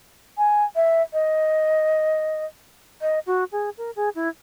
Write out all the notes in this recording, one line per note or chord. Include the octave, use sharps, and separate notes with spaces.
G#5
E5
D#5
D#5
F#4
G#4
A#4
G#4
E4